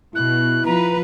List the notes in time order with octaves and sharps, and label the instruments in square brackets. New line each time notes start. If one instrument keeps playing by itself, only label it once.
[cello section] B2 [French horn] E4 [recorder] F#6
[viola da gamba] F3 [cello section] B4 [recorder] A#5